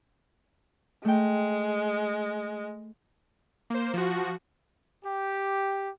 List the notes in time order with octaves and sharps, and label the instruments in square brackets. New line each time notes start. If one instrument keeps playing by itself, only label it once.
[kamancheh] G#3 [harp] A3 G5
[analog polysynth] A#3 C5
F3 F#4
[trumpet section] G4